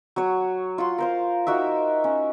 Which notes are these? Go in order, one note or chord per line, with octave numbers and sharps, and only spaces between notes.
F#3 F#4 C#5
F4 F#5 C6
A#4 C5 F5
D#4 F#4 A#4 E5
C#4